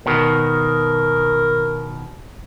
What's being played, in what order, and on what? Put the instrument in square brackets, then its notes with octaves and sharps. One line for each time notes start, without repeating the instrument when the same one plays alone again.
[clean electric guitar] B2 D#3 [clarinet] A#4